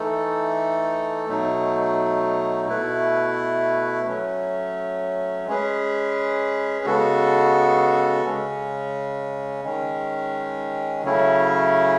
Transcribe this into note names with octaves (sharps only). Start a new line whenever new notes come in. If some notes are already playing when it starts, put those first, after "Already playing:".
Already playing: E3 A3 D#4 A4
B2 F#3 A3 D#4
B2 A3 E4 B4
F#3 A3 C#4
G#3 C#4 G#4 B4
C#3 G#3 B3 F#4 A4
C#3 G#3 C#4
D#3 G#3 C#4
C#3 F#3 A3 C#4 E4